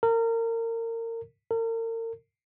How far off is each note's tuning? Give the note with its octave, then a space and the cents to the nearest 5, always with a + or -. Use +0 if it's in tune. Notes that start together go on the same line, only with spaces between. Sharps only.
A#4 -30
A#4 -40